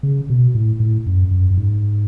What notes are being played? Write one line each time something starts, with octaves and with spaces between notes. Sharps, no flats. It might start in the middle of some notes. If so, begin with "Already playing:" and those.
C#3
B2
A2
A2
F#2
F#2
F#2
G#2